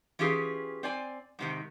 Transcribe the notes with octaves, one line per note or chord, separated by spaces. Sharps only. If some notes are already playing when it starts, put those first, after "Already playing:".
E3 C#4 F4 G4 G#4
C4 D5 G#5
G#2 C3 D#3